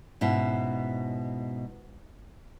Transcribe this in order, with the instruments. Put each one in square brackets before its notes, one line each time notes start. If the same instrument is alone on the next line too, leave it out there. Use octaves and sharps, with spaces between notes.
[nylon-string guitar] G#2 B2 C#4 E4